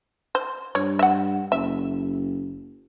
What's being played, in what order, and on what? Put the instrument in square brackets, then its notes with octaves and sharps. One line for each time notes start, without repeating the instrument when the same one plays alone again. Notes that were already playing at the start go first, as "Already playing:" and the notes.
[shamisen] C5
[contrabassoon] G2 [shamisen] C#5
[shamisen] E5 F#5
[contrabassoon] F#1 [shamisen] E5